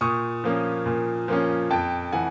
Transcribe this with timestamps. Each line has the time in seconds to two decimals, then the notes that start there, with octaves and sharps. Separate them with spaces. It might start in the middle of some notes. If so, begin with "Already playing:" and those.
0.01 A#2 C#6 D#6
0.44 F3 A#3 C#4
0.86 A#2
1.28 F3 A#3 C#4
1.70 F2 G5 A5
2.12 E3 F#5 G#5